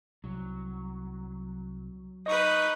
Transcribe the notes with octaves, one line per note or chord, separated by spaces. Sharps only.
C2 F#3
D#4 B4 D#5 C#6